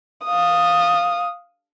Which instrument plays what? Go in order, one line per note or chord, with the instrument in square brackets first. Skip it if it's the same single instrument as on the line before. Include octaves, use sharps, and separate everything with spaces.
[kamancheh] F5 D#6